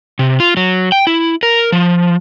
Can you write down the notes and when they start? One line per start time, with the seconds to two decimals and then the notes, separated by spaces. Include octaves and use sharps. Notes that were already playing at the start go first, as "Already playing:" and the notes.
0.19 C3
0.40 F4
0.57 F#3
0.92 G5
1.07 E4
1.43 A#4
1.72 F3